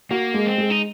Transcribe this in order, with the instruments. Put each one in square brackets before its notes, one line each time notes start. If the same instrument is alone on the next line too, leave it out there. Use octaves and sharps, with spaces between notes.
[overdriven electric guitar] A#3 [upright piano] F#4
[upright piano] G#3
[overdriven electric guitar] C4
[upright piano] G#3
[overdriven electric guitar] D#4